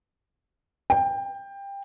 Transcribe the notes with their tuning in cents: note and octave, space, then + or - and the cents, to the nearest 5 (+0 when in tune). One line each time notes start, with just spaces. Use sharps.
G5 +20